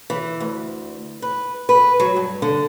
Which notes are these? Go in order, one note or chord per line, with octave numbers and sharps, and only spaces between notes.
E3
D2
B4
B4
F#3
G2
D3